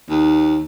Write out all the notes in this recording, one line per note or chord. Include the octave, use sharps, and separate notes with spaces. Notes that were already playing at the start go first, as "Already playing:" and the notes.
D#2